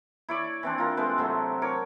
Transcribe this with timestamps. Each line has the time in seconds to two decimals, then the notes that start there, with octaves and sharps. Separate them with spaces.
0.29 E4 C#5 D5
0.63 E3 C4 D4
0.78 F4 A#4
0.97 G#3 A3 C4 B4
1.18 C3 F#3 A3
1.62 A#4 C#5 D6